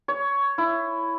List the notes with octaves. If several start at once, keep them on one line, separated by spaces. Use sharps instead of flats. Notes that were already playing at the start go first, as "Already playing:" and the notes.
C#5
E4